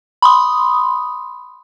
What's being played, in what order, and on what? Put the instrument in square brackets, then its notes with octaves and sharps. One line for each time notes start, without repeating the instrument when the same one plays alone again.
[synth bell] B5 C6 D#6